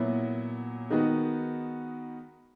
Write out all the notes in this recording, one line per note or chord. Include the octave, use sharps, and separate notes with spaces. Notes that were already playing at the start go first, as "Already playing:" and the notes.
Already playing: A#2 F#3 B3 E4
D#3 G#3 B3 D#4 F#4